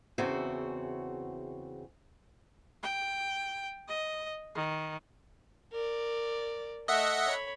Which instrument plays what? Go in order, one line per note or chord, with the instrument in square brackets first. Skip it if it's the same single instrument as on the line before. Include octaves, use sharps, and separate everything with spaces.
[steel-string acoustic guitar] E2 C#3 C4 F#4 E5
[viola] G5
D#5
D#3
[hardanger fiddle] A#4 D5
[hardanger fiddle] A3 [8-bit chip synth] D#5 E5 F#5
[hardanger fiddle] C#5 B5